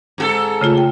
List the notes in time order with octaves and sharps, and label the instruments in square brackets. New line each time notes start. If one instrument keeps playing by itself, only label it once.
[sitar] G#2 F#4 A4
[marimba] C#3 A3 F4
G5